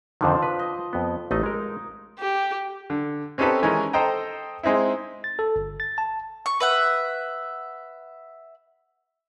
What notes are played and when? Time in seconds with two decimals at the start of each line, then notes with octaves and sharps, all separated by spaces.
0.21 F2 D3 D#3 F3 D4 C5
0.42 B4
0.59 D#5
0.93 F2 B3
1.31 A1 A3 D#4 D#5
1.43 G#3 A#4
2.19 G4
2.90 D3
3.38 C4 C#4 D#4 G4 A4 B4
3.62 D#3 E3 G#3 C#4 A#4
3.93 A4 C5 D#5 G5 A#5
4.63 G#3 C4 D#4 E4
5.24 A6
5.39 A4
5.56 G1
5.80 A6
5.98 A5
6.46 C#6
6.60 B4 E5 F#5